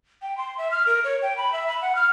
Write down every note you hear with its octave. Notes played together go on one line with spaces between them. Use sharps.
G5
C6
E5
F6
A#4
C#5
G5
B5
E5
B5
F#5
F6